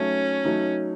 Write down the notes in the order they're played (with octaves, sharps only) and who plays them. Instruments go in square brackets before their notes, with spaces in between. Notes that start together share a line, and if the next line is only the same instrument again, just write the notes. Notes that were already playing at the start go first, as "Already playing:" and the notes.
Already playing: [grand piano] F#3 A3 D#4 [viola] C#4
[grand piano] F#3 A3 D#4